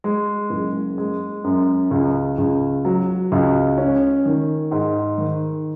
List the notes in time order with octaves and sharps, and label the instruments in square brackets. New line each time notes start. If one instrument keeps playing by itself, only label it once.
[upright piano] G#3
F#1
G#3
F#2
C#2
C#2
F#3
C#2
C#4
D#3
G#2
D#3